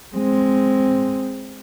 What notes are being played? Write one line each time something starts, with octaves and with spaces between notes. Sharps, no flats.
G#3 C4